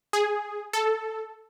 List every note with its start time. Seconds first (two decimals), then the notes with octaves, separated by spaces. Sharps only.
0.13 G#4
0.73 A4